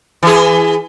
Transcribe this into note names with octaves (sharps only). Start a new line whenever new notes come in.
E3 G#4